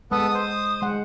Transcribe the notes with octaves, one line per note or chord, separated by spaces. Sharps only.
G#3 B3 A4 B4 D#6
C5
G#3 F#5